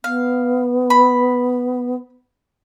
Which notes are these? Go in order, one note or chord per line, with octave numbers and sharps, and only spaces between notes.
B3 F5
B5